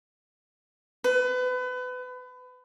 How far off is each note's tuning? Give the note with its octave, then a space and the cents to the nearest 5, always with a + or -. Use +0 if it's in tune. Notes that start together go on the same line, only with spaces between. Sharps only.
B4 +30